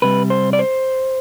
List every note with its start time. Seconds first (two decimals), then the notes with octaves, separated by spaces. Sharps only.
0.02 C3 G3 B4
0.30 C5
0.53 D5
0.59 C5